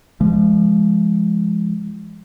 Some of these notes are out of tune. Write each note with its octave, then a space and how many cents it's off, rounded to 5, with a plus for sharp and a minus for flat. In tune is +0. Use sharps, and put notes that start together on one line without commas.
F3 -30 G#3 +0